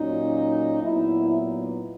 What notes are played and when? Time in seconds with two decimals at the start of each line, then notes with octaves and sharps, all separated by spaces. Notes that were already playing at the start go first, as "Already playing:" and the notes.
Already playing: A#2 F#3 C#4 D#4
0.82 A#2 F#3 B3 D#4 E4